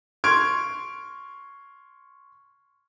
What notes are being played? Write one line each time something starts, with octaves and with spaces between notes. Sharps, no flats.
C6 C#6 F6 G#6 D7